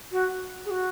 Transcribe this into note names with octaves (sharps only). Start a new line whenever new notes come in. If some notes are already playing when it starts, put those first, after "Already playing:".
F#4
G#4
F#4